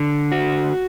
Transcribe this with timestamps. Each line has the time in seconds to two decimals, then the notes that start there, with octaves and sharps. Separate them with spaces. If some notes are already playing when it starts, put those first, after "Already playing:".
Already playing: D3
0.32 F#4